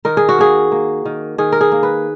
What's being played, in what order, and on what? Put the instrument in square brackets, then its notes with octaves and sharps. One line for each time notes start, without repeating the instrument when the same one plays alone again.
[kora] D#3 A#4
G#4
F#4
A#3 G#4
A#3
D#3
D#3 G#4
A#4
G#4
A#3
B4